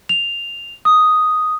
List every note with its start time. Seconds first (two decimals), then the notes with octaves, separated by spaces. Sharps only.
0.09 F7
0.85 D#6